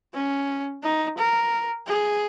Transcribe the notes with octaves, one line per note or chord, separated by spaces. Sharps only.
C#4
D#4
A#4
G#4